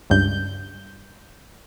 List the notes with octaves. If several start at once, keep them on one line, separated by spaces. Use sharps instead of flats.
C#2 G2 G6